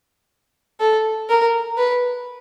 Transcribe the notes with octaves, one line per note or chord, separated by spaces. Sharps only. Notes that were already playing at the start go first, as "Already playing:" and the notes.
A4
A#4
B4